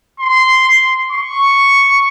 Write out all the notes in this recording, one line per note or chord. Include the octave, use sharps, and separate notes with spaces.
C6
C#6